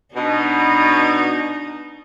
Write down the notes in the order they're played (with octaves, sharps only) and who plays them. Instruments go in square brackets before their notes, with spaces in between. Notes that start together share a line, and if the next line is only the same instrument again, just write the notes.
[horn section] B2 [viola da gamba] D4 D#4